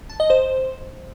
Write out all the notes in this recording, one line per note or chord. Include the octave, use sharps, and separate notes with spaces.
A5
D#5
C5